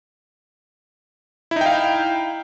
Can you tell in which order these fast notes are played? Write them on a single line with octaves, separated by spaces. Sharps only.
E4 D#4 G5 F5